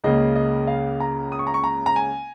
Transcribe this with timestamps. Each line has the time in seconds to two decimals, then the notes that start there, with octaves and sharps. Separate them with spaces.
0.04 C#2 C#3 A#3 D#5
0.36 D#5
0.67 F5
1.00 A#5
1.32 D#6
1.39 C#6
1.47 A#5
1.54 C#6
1.64 A#5
1.86 A#5
1.96 G#5